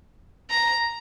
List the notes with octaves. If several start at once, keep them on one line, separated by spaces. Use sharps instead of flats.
A#5